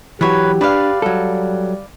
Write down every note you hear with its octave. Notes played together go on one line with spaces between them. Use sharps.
E3 F#3 G4 B4 C#5
D4 B4 D5 F5
F#3 G3 A4